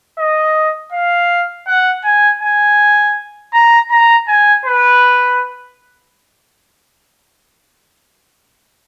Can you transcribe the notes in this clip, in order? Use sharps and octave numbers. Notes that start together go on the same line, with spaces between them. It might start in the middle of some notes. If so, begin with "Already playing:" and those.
D#5
F5
F#5
G#5
G#5
A#5
A#5
G#5
B4